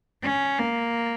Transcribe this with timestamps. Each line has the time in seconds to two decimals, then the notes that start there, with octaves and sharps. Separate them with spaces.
0.23 C#4
0.59 A#3